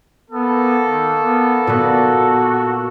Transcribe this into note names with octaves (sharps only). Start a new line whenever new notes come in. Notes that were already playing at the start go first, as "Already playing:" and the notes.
A#3 B3 A4
D#3
B3
A#2 B3 F#4